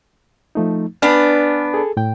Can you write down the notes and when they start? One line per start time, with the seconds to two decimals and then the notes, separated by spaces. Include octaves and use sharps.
0.55 F3 A3 D#4
1.02 B3 D4 B4 G#5 F6
1.74 G#4 A4
1.97 A2 G5